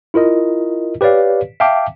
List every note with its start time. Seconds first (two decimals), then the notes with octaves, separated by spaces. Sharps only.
0.14 E4 F4 A#4 D#5
1.01 G4 B4 C#5 D5 F5
1.60 E5 F5 G5 A5 D6